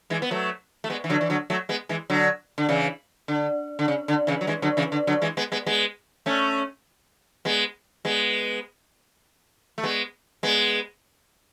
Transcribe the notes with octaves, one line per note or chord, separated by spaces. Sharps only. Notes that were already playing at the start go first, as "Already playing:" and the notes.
E3 G#3
B3
F#3 A3
A3
G#3 B3
E3
D3 F#3
E3
D3 F#3
F#3 A3
G#3 B3
E3 G#3
D3 F#3
D3
C#3 E3
D3
D3
C#3
D3
C#3 E3
F#3
E3 G#3
D3 F#3
C#3 E3
D3
D3 F#3
E3 G#3
G#3 B3
G#3 B3
G#3 B3
A3 C#4
G#3 B3
G#3 B3
A3
G#3 B3
G#3 B3